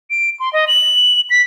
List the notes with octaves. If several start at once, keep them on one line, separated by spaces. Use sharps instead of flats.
D7
C6
D#5
F#7
B6